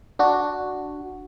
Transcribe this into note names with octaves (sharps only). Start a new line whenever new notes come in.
D4 F#4